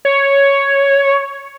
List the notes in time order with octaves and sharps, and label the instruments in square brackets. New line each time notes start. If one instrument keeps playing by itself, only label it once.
[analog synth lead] C#5